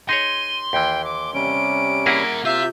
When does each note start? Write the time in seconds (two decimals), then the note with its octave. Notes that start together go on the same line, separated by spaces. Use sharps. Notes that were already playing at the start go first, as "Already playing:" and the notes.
0.09 D#4 G#4 C#5 C6 D#7
0.73 D#2 E3 G5
1.04 D6
1.34 C3 G3 C#4 D7
2.06 A#3 E4 G#4 A#4 F#5
2.45 C3 F4 E5 G6